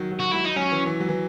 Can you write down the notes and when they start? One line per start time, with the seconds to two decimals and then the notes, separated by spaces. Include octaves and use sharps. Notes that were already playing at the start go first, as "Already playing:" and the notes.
Already playing: D#3 F#3
0.12 F#3
0.20 F#4
0.32 F#3 E4
0.45 D#4
0.56 F#3 C#4
0.71 E3
0.86 E3
1.00 F#3
1.09 E3